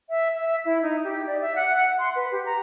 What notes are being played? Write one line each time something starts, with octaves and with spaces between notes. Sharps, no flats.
E5
E5
E4
D#4
G4
D5
E5
F#5
C6
B4
G4
A#5